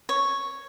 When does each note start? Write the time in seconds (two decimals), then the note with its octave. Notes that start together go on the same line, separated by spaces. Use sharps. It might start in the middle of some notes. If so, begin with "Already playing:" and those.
0.09 C#5